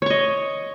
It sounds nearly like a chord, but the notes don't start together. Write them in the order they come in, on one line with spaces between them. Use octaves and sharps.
C#5 C#6 D#5